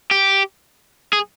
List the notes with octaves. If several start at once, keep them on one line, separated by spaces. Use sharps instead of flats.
G4
G#4